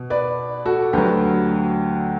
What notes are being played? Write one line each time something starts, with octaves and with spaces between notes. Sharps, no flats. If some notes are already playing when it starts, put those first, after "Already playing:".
Already playing: B2
B4 D5
F#4 A4
D2 D3 F#3 G4 B4